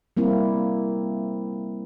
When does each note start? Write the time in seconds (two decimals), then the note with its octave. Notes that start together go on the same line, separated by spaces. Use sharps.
0.17 G3 A#3 C4 E4